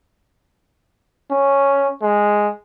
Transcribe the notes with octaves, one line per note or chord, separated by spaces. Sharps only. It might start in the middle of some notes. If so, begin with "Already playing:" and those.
C#4
G#3